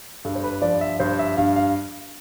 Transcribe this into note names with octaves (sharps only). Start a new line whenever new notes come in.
G2 A4
C5
B4
F3 D5
E5
G2 C5
E5
G2 F5
F5